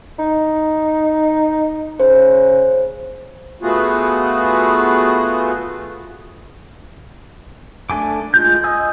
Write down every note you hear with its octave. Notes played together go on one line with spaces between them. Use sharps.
D#4
C#3 C5
A3 B3 F4 F#4 G#4
A3 D4 A4 G#5 D6
G#3 F4 G6
D#5 G#5 D#6 E6